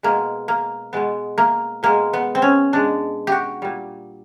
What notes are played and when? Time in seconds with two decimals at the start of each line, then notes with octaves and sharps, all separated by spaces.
0.03 B2 G#3 A#3
0.48 A#3
0.93 B2 G#3 B3
1.38 A#3
1.83 B2 G#3 A#3
2.13 B3
2.35 C4
2.42 C#4
2.73 B2 G#3 D4
3.27 F#4 G4
3.62 A#2 G3